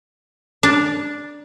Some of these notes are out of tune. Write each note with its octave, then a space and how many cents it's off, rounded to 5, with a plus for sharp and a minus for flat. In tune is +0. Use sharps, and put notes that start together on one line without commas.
D4 +0 A#4 +20